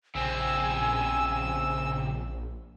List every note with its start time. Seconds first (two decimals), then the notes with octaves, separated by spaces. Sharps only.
0.15 A#1 C#3 C4 G#5 E6